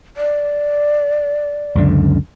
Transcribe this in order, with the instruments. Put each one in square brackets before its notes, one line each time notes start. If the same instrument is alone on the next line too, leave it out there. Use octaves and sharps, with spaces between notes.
[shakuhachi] D5
[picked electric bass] C#2 F#2 D3